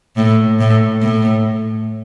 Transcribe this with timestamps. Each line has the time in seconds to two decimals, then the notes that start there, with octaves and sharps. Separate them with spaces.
0.17 A2
0.60 A2
1.02 A2